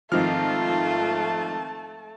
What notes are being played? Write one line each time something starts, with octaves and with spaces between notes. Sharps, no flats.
G#2 D#3 F3 A3 C4 F4 A5 F6